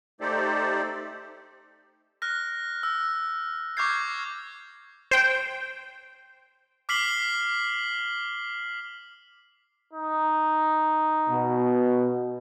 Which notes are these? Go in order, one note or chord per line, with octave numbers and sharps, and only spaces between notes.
A3 D#4 G4 A4 C5 D5
F6 F#6 A#6
E6
C#6 D6 F6 G6 G#6 C7
C5 G5
D6 F6 B6 C7 F#7 G7
D#4
B2